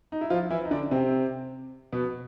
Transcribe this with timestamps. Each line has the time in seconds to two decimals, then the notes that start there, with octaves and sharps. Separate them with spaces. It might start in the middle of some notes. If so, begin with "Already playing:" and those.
0.12 D#4
0.21 E4
0.30 F3 F4
0.51 E3 E4
0.65 D#4
0.71 D3 D4
0.91 C3 C4
1.92 B2 B3